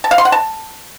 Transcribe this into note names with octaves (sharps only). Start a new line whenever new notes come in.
A5
F5
C6
F#5
A5